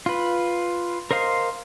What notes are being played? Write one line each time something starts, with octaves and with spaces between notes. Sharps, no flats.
F4 B4
A#4 C5 D#5 F5 C6